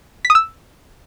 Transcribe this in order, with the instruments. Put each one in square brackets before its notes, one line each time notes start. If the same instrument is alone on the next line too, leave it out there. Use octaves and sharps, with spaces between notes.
[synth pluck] B6
D#6
E6